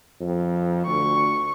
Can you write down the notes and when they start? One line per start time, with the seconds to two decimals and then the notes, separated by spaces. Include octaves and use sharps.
0.21 F2
0.87 D2 C#6